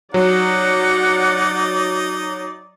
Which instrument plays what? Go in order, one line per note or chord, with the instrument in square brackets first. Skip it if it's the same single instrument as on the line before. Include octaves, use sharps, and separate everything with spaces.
[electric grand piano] F#3 [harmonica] D#4 [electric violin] D5 [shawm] F#5